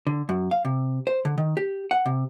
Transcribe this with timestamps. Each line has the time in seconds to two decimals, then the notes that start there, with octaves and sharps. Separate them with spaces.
0.07 D3
0.29 F#2
0.51 F5
0.65 C3
1.07 C5
1.25 D3
1.38 D#3
1.57 G4
1.91 F#5
2.06 C3